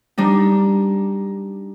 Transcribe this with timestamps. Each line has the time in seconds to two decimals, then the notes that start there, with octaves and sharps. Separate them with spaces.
0.18 G3 D4 D#4